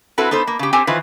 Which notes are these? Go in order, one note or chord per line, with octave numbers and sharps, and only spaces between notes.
C4 E4 F#4 A4 B4
B3 D#4 A4 C5
A#3
C#3 G4
C4 G4 A4 C5 G#5
D#3 E3 F4 B4 C5